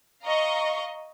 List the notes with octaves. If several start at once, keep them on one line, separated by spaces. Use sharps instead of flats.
D#5 F5 A#5 C#6